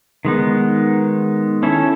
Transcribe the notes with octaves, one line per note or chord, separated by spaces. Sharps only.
D#3 G#3 B3 D#4
C#4 E4 A4 C#5